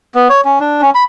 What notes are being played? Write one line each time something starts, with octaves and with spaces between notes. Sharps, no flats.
B3
C#5
C#4
D4
C#4
B5